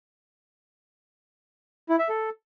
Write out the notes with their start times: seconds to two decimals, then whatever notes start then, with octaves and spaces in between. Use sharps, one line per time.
1.89 E4
1.99 E5
2.09 A4